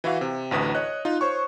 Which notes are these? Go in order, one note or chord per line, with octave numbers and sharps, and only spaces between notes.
E3 E4 F#4 F5
C3
A1 D2 B4 D#6
C#5 D#5 F#6
D#4 F4
C5 C#5 C#6